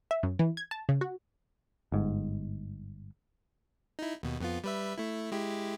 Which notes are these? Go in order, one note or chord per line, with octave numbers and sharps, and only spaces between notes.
E5
F#2
E3
G#6
A5
C#3
F#4
G1 G#2
D#4 E4
D#2 B2
F2 B3 F4
G3 B4 E5
A3 E4
G#3 E4 G4